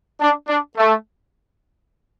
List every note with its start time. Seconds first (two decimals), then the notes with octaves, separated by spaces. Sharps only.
0.20 D4
0.48 D4
0.76 A3